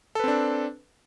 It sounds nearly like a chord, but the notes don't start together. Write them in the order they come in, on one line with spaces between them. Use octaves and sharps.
A4 B4 C4 D4